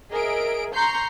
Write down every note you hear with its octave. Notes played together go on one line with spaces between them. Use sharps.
G#4 A#4 D#5 E5 D7
A#5 C6 C#6 G6 C7